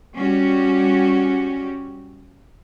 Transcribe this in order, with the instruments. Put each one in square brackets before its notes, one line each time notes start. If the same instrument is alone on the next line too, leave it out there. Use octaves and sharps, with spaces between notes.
[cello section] G3 C#4 F#4 G4